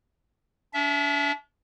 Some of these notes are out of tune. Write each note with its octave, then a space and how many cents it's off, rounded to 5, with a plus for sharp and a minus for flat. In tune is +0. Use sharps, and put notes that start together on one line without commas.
D4 -40 E5 +0